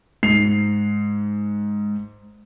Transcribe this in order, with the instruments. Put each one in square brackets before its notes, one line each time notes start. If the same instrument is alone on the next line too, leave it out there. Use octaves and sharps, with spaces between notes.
[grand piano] G#2 C7 F7